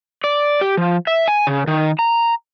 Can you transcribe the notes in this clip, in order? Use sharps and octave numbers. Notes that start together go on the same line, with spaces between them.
D5
G4
F3
E5
G#5
C#3
D#3
A#5